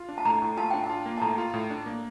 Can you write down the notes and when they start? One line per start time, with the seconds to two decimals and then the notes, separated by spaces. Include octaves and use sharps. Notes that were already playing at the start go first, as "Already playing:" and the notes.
Already playing: F4
0.09 D4
0.18 A5
0.25 A2 A#5
0.42 A2
0.57 F4 A5
0.70 D4 G5
0.84 A5
0.90 F4
1.06 A#3
1.18 A5
1.21 A2 A#5
1.38 F4
1.54 A2
1.70 D4
1.86 A#3